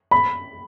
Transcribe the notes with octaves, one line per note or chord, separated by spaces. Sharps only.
B5